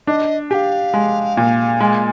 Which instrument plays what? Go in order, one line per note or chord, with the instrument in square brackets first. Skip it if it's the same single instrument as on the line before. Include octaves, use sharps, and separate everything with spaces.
[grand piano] D4 [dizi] D#5
[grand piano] G4 [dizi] F5 G#5
[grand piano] G#3
A#2
G#3